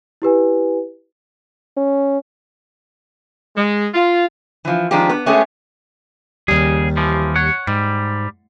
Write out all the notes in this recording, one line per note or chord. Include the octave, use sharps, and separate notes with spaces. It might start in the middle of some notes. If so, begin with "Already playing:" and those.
E4 G4 B4 G#5
C#4
G#3
F4
E3 F3
D#3 F3 G#3 C4 D4 G4
B3
G#3 A3 B3 C#4 G4 G#4
D#2 C#3 G3 G#4
E3 F3
C#5 F#5
G#2 G3